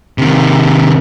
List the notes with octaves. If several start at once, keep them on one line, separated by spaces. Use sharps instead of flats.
C3 D#3